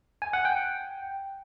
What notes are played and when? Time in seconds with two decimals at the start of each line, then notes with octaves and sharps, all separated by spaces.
0.22 G#5
0.33 F#5
0.45 G5